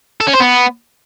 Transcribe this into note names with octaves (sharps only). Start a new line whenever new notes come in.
A4
C#4
C5
B3